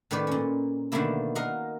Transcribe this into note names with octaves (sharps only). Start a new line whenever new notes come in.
A2 D#3 B4 D5
A#2 C#4
B2 D3 D#3 A3 A#3 E4
A#4 D#5 F5 F#5